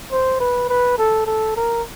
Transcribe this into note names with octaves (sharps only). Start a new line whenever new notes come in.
C5
B4
B4
A4
A4
A#4